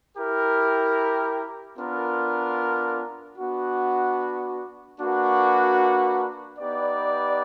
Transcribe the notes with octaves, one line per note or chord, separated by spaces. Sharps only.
E4 G4 A#4
B3 D4 F4 A#4
B3 D4 F#4
A#3 D4 F#4 B4
B3 D#4 G4 B4 D5